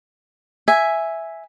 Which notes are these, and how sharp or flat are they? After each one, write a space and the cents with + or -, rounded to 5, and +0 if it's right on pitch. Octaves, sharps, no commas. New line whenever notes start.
E5 +0 G#5 +0